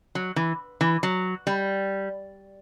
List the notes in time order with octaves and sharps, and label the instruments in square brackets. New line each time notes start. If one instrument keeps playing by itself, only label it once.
[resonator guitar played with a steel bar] F#3
E3
E3
F#3
G3